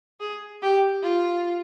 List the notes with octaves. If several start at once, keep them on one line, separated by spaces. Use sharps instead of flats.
G#4
G4
F4